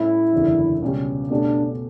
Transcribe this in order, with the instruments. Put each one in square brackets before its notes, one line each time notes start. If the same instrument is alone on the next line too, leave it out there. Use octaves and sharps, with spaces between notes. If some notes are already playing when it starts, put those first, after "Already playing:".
Already playing: [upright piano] A2 G3 C#4 [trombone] E4
[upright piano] F#1 E2 D3 G3
C#2 B2 G3 C#4 G4
[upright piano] B2 A3 C#4 G4 [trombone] D4